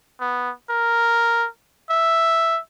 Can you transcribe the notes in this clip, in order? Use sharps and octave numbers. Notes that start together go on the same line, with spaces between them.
B3
A#4
E5